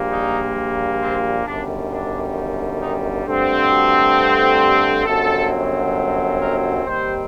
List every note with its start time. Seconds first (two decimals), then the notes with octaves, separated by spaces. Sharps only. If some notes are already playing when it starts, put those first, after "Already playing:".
Already playing: A#1 A#2 G3 A#3
0.12 D#4
1.02 C4
1.47 G1 F#2 D#3 G3 D4
1.92 D4
2.82 D#4
3.27 G2 D3 A3 C4
3.71 F#4
4.61 G4
5.06 G1 F#2 F#3 C4 A4
6.41 A#4
6.86 D#2 D#3 G3 C4 C5